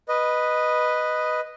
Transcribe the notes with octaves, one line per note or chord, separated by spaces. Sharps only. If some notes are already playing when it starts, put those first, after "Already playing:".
B4 D#5